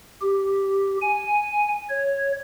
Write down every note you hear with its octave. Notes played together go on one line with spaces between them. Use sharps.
G4
G#5
C#5